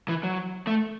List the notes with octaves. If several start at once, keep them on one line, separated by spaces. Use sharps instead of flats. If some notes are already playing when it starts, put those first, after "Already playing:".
E3
F#3
A3